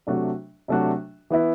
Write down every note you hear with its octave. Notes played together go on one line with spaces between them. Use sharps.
C3 F#3 A3 D4 F#4
C3 F#3 A3 D4 F#4
E3 B3 E4